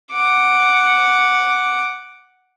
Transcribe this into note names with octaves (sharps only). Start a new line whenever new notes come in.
F#5 D6